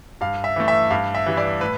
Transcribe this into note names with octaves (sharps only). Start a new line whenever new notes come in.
G2 F5
E5
E3 A3
E5
G2 F5
E5
E3 G3
D5
A2 B4